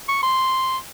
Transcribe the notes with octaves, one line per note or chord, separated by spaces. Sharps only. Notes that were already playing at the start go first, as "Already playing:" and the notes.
C#6
C6